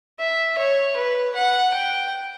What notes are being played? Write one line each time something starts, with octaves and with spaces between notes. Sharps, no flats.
E5
C#5
B4
F#5
G5